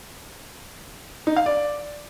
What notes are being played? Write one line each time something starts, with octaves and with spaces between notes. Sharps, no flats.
D#4
F5
D5